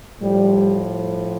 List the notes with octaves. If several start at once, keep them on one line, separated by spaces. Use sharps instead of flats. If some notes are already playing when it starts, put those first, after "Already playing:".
A2 F3 G3